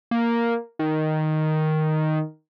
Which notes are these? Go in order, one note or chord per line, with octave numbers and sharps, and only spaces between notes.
A#3
D#3